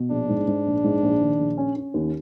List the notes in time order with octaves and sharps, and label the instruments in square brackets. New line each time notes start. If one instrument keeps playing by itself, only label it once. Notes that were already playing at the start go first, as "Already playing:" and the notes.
Already playing: [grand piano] B2
[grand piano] A#1 [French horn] D4
[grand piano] G#2
G#2
A#1
G#2
A#1
D#3
A#1
C#4
C#4
D#2